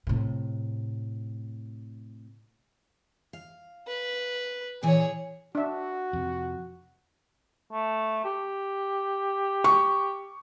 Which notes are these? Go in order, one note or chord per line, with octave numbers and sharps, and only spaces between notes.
A2 C3
F5
B4
A#2 E3 G#4 C#5 G#5
D4 F#4 E5
F2 C3
A3
G4
C#6